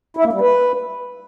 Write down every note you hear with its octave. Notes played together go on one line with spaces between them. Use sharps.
E4
A#3
G3
B4